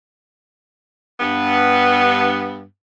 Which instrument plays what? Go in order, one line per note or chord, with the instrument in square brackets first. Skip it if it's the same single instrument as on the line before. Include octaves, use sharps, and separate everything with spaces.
[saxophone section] G2 B3